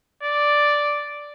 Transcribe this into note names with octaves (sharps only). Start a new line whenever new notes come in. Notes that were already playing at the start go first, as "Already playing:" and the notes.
D5